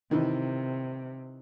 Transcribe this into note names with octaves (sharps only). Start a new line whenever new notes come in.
C3 D#3 E3